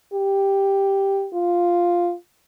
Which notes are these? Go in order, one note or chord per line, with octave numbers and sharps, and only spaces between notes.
G4
F4